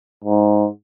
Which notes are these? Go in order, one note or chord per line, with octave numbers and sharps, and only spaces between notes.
G#2